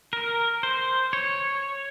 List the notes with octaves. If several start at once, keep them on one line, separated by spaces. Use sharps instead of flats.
A#4
C5
C#5